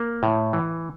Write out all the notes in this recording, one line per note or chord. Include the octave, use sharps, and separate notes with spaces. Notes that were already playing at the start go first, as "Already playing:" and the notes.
Already playing: A#3
A2
E3